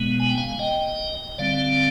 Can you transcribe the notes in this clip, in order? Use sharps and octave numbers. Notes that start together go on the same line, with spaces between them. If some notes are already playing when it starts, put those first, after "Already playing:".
Already playing: B2 G#3 B3
G#5
G5
F5 G#5
D#5 G5
D3 G3 C4 D5 F5